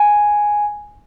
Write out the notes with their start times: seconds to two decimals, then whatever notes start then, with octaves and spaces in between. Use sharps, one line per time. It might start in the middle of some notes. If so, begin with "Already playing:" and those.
Already playing: G#5